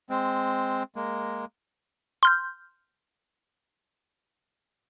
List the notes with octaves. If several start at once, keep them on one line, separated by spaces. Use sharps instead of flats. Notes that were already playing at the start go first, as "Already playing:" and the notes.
G#3 C4
G#3 A#3
C6 F6 G6